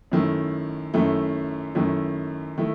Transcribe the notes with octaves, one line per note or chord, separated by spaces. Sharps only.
F#2 D#3 A3 E4
F#2 D#3 A3 E4
F#2 D#3 A3 E4
D#3 A3 E4